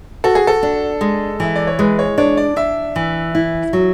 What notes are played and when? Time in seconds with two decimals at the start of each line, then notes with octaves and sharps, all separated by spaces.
0.24 F#4 A4
0.35 G#4
0.47 A4
0.63 D4
1.01 G#3
1.40 E3 E5
1.56 D5
1.67 C#5
1.79 G#3 B4
1.99 C#5
2.18 D4 C#5
2.37 D5
2.56 D4 E5
2.96 E3
3.35 E4
3.73 F#3